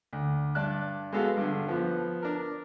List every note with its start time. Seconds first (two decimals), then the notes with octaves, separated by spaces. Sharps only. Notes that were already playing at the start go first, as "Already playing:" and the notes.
0.13 D2
0.55 G2 D5 A5 F#6
1.12 G#3 B3 F#4 A4 F5
1.37 G2 D3
1.68 F3 B3
2.23 D4 A#4